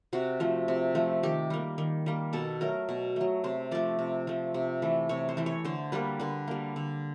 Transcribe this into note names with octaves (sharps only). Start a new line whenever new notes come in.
C3 F#4
F3 A3
C3
F3 A3
D#3 G4
G3 A#3
D#3
G3 A#3
B2 A4
F#3 A3 A#4
B2
F#3 A3
C3 C5
F3 A3 D5
C3
F3 A3
C3
E3 A3
C3 C#5
C5
E3 A3
C#5
D3 C5
G3 A#3 B4
D3 B4
G3 A#3
D3